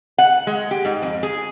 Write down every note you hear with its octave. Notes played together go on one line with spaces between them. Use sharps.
F#5
G#3
G4
G#2
F2
G#4